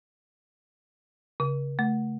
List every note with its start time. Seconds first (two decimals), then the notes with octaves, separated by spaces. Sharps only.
1.40 C#3
1.79 A3